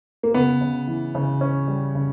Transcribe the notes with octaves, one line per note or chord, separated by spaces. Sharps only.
A#3
C#3 B3
C#3
E3
C#3
C#4
G3
C#3